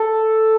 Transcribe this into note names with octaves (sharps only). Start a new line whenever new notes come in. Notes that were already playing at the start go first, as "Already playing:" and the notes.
Already playing: A4